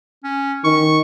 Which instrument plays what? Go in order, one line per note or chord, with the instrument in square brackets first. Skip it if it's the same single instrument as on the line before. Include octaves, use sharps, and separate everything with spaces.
[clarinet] C#4
[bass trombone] D#3 [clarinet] C#6